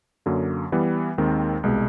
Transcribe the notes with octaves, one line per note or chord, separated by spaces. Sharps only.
F#2 D3 F#3 A#3
E3 G3 B3
D#2 D#3 G#3 C4
C2 B2 G#3